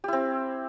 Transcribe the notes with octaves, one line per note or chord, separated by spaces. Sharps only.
C4 E4 G4